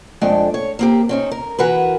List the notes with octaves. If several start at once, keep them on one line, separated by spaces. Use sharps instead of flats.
F2 G#3 A3 D4 G5
C#5
A#3 C4 G4
C4 C#4 D#4
A#4
E3 F#4 A#4 B4